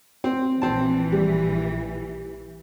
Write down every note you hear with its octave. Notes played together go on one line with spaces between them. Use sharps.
C4
A#1 E3 C4 A5
G3